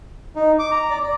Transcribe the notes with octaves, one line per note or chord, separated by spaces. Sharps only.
D#4
D6
A#5
D5
D5